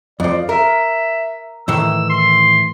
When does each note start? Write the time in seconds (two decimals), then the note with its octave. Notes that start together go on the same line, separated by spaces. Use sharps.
0.20 F2 F3 D5
0.49 A#4 E5
1.68 A2 D#3 E3 E6
2.10 C6